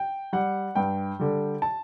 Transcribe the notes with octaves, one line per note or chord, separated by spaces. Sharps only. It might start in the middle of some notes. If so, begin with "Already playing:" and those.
Already playing: G5
G3 F#5
G2 G5
D3 G3
A5